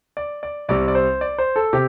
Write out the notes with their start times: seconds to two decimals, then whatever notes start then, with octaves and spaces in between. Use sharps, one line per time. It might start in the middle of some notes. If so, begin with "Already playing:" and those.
0.17 D5
0.43 D5
0.69 C2 C3 G3 C4 D5
0.88 D5
0.95 C5
1.21 D5
1.38 C5
1.56 A4
1.73 C3 G4